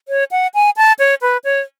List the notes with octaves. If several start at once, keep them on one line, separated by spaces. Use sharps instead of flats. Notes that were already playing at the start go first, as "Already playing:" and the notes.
C#5
F#5
G#5
A5
C#5
B4
C#5